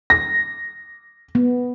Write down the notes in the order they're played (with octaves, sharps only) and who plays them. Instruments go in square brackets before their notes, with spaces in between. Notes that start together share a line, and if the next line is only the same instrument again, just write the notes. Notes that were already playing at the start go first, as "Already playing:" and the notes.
[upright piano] A#6
[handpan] B3